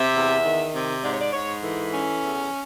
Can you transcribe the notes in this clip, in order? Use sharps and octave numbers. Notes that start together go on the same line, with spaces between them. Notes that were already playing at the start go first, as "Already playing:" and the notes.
Already playing: C3 E5
E2
D#3
C3
G#2 D5
C#5
D5
G#2 C#5
E3 A4
C#4
E2